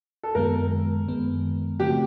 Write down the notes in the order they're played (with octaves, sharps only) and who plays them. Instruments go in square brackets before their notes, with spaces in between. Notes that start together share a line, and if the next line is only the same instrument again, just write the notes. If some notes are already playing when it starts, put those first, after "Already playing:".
[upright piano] A4
[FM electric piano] F#2 D#3 G#3 B3 [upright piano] A#4
[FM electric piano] F#2 D#3 G#3 B3
[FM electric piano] C#3 F3 A3 C4 [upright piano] G4